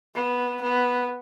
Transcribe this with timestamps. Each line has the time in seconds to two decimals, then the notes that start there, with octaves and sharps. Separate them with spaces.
0.15 B3
0.62 B3